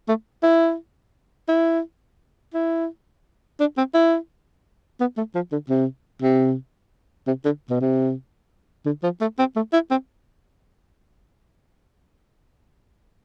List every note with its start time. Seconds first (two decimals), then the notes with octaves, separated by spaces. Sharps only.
0.08 A3
0.43 E4
1.48 E4
2.54 E4
3.60 D4
3.78 C4
3.94 E4
5.00 B3
5.17 A3
5.35 F3
5.52 D3
5.69 C3
6.22 C3
7.27 C3
7.45 D3
7.70 B2
7.81 C3
8.86 D3
9.03 F3
9.21 A3
9.39 C4
9.56 A3
9.73 E4
9.91 C4